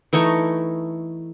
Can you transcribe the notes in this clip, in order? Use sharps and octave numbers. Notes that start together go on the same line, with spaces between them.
E3 A3 D#4 C#6